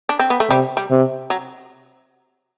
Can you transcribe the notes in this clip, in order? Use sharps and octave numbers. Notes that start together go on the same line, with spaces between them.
D4
C4
B3
A3
C3 G3
G3
C3
F#3